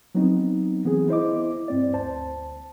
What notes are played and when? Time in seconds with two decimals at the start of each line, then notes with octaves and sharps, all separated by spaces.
0.15 F#3 B3 C4 D#4
0.85 E3 B3 C4 G#4
1.09 E4 C5 D#5 D6
1.68 G2 C4 D5
1.93 D2 C5 A5